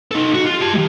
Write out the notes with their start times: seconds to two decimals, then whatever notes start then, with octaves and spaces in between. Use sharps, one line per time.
0.11 D#4 A4
0.34 F#4
0.45 F4
0.61 G4 A5
0.73 D#3 G#3